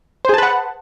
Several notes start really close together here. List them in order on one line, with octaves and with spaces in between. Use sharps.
C5 G#4 A5 B4 F#5